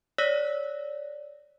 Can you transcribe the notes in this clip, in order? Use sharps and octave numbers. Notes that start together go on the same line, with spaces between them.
C#5 D5 E6 F#6 A#6 B6